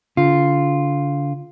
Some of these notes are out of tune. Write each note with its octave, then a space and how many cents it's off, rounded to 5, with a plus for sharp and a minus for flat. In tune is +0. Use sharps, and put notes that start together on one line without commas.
D3 -40 F4 +0